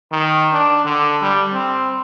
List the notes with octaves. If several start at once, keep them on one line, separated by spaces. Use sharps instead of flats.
D#3
D4
D3
G3
C4